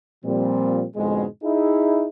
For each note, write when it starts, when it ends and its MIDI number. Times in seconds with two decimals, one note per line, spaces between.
0.24 0.84 46
0.24 0.84 53
0.24 0.84 55
0.24 0.84 60
0.96 1.25 41
0.96 1.25 44
0.96 1.25 47
0.96 1.25 50
0.96 1.25 56
1.44 2.08 63
1.44 2.08 64
1.44 2.08 68